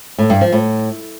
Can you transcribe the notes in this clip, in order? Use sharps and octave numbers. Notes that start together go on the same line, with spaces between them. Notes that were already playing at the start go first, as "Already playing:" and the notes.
A2
G2
F3
A2